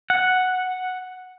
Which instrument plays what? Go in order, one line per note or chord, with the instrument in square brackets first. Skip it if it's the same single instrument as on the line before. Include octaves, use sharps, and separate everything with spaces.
[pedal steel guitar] F#5